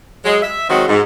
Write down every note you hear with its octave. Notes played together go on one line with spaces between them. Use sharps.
F#3 G#3
E5
D#3 F#3 G#3 C4 F#4
G#2